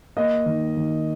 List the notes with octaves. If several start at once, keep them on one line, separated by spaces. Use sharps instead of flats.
A#3 D#5
D#3
D#3